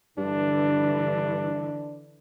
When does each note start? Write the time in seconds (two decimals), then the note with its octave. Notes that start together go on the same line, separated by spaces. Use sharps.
0.18 G2 D3 E3 D4